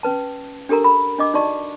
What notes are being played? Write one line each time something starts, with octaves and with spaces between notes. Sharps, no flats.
C#4 B4 A5
D4 G4 A4 A#4 A#5
B5
D4 D#5 D6
D#4 F#4 D5 D#5 A5 C#6